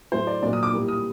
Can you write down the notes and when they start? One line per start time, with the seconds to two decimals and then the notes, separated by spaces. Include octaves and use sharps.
0.12 A2 F#3 A3 C5
0.27 D5
0.43 A#2 F#3 A#3 D5
0.53 D#6
0.63 D6
0.72 A2 G3 A#3
0.88 D#6